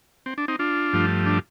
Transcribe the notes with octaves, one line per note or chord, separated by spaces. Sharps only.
C4
D4
C4 D#4
D4 F4
G2 F3 A3
D4